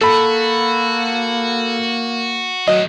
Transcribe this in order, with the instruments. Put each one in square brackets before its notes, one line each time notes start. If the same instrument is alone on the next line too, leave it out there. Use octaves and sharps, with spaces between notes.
[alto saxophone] A#3 [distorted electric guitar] F#4 [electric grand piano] A4 B5
[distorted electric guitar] A2 D#3 [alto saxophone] F#3 [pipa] D#5